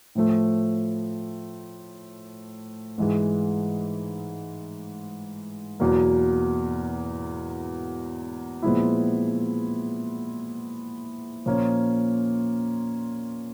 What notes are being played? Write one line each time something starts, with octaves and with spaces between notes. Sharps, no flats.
A2 F3 A3
G#2 E3 G#3
E2 B2 F#3 A#3
A#2 F3 G#3 B3 E4
A#2 F3 A#3 C#4